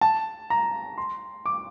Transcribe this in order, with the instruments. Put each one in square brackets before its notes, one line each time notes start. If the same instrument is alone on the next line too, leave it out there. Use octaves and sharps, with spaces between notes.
[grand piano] A5
A#5
C6
D6